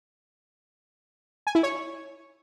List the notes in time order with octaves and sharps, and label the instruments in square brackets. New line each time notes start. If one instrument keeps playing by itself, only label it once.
[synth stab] G#5
E4
C#5